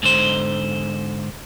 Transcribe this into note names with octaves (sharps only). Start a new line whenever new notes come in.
G#2 D3 C5